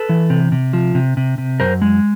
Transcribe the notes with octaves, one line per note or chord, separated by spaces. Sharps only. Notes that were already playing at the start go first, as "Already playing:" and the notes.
Already playing: A4 B4
E3
C3
C3
F3
C3
C3
C3
F#2 A#4 C5
G#3